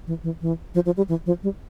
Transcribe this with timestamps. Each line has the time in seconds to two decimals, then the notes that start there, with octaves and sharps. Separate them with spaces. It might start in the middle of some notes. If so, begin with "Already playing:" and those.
0.07 E3
0.24 E3
0.41 E3
0.74 F3
0.86 F3
0.97 G3
1.09 E3
1.26 F3
1.43 G3